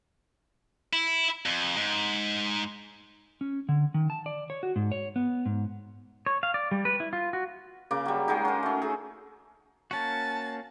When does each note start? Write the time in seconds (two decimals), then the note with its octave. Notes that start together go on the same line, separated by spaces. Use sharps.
0.93 E4
1.46 F2
1.77 G#2
3.41 C#4
3.69 D3
3.94 D#3
4.10 A5
4.26 D5
4.50 C#5
4.63 F#4
4.76 G#2
4.92 C#5
5.16 B3
5.46 G#2
6.26 C#5
6.43 F5
6.54 D5
6.71 G3
6.85 B4
7.00 E4
7.13 F4
7.33 F#4
7.91 C#3 A#3 D6
8.06 F#3 G3
8.28 F#3 G#3 D#4
8.45 C#4 A#4
8.63 A3 C#4
8.82 G#4 A4
9.91 A#3 C#4 F#4 A5